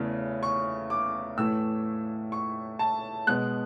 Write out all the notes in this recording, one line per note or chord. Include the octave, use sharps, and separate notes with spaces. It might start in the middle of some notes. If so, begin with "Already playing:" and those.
Already playing: E2 C#3 E3 A3
C#6
D6
A2 E3 A3 E6
C#6
A5
B2 G#3 B3 F#6